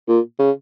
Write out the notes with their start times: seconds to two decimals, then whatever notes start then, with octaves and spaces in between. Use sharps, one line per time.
0.08 A#2
0.39 C#3